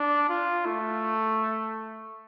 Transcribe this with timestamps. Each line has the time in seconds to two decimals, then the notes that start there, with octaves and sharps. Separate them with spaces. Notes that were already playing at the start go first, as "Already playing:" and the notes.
Already playing: D4
0.29 F4
0.65 A3